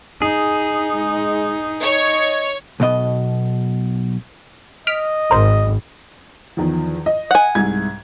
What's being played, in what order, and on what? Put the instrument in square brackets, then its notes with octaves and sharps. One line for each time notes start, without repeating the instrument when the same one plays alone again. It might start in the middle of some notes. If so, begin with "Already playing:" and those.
[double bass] D#4 [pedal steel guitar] G#4
[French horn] G#3
[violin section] C#5 [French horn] D#5
[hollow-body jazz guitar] B1 B2 D#5
[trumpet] D#5 [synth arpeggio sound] F6 B6 D7
[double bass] G#1 [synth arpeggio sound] A#4 C5
[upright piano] E2 D#3 F3
D#5
[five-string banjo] F#5 G#5
[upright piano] C2 G#2 G#6